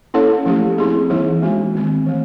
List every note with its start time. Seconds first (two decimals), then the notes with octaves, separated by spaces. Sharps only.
0.14 A#3 C#4 E4 A4 C#5
0.46 F3 A3 C#4 E4 G4
0.78 C4 E4 G#4
1.10 E3 G3 A#3 D#4 G#4
1.42 E3 G#3 B3 D4 F#4
1.74 D#3 G#3 C4
2.06 E3 A3